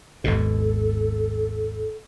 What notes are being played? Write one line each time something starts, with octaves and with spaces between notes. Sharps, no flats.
G#1 D#2 B2 A4